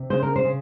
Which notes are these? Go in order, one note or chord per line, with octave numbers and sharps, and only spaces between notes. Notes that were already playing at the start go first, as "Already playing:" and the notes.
Already playing: C3
C#3 C5
A#4
C5
C#3